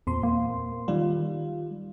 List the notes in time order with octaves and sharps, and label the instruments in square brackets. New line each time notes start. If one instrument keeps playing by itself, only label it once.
[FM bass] E2 [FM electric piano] A#2 C4 C6
[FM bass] A#3
[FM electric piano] D#3 F4 [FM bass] G3